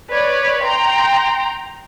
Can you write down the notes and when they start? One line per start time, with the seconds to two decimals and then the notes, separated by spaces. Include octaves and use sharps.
0.11 B4 C#5 D5
0.64 G5 A#5 C6